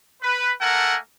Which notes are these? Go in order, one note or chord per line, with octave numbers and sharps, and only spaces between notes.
B4
A3 A#3 A4 A#4 F#5 G#5